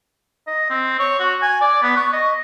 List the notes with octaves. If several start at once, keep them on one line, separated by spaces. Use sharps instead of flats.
D#5
C4
C#5
F#4
G#5
D5
B3
C#6
D#5